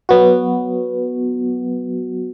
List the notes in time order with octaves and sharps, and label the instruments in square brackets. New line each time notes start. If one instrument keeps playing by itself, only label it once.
[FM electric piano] F#3 B3 F#4